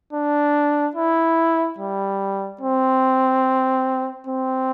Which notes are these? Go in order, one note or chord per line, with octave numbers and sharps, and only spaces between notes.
D4
E4
G3
C4
C4